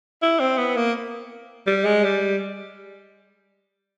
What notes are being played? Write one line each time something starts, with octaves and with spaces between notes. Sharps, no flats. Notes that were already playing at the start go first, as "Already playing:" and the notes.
E4
C4
B3
A#3
G3
G#3
G3